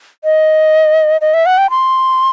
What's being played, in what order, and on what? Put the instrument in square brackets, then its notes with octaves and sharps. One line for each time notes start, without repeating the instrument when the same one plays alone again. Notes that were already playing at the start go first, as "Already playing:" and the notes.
[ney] D#5
D#5
E5
F#5
G5
C6